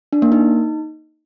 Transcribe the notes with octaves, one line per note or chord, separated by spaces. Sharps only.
D4
A#3
D#4